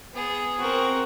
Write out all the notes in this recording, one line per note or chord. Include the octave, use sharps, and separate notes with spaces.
B3 G#4
C4 F#4 A#4